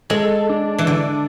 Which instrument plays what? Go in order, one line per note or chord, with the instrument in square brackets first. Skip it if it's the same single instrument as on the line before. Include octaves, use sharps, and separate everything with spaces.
[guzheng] G#3 [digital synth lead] A4
[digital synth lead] D4
[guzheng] E3
[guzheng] D3 [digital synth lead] D4